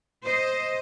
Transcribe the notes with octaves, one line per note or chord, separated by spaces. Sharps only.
C5 D#5